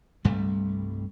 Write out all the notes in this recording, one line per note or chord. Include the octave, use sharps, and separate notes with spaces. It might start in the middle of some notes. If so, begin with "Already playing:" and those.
C2 G2 G3 A3